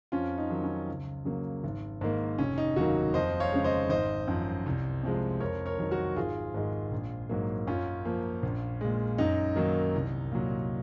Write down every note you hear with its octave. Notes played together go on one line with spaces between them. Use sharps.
F2 C#4 F4
D#4
D#3 F#3
C#4
C#2
C#3 F#3 A#3
G#1
G#2 D#3 A#3
F1 C#4
D#4
D#2 C#3 F#3 A#3 D#4 F#4
F2 C5 D#5
C#5 F5
C#3 G#3
C5 D#5
G#1 C5 D#5
F#2 F3
C2
C3 F3 G#3
F2 A#4 C#5
A#4 C#5
D#3 F#3
F#4 A#4
G#1 F4 G#4
G#2 D#3 G#3
A#1
G#2 F#3 A#3
F#2 C#4 F4
F3 A#3
A#1
A#2 G#3
F#2 D#4
D#3 F#3 A#3
C2
A#2 F#3